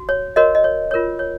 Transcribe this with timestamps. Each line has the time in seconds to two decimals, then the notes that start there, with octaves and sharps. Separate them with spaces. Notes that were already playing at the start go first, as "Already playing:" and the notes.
Already playing: F#4
0.09 C#5
0.36 F#4 A#4 C#5 D#5
0.55 D#5
0.64 C#5
0.91 F4 A#4 C#5
1.19 C#5